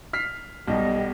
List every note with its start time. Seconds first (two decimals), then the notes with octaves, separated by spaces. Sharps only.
0.13 F6 B6 C7
0.68 B1 B2 G3 B3 D#5